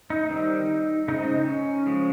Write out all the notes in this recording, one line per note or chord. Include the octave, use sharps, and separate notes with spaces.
D#4
D#3 G3 C4
C#3 G#3 C4 D#4
C#4
C#3 F3 G#3